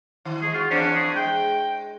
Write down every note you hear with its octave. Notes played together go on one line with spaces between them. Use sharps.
D#3
G#3 G#4
F4 F#4
E2 C#4 D4 C5
G#4
G#3 G5